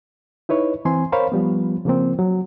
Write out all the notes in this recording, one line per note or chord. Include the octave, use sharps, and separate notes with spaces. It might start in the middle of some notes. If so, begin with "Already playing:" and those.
D#4 E4 B4 C#5
E3 C4 G#5 C6
A#4 C5 C#5 F5 B5
F3 G3 B3
C#3 F3 A#3 C4
F#3